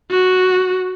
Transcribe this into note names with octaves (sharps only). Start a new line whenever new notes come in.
F#4